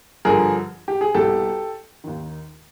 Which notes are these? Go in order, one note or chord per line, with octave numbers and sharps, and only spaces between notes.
G2 D3 F3 G#4 A#4
G4
G#4
C2 B2 G4 A4
D#2 D#3